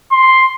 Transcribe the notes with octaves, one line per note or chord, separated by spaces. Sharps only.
C6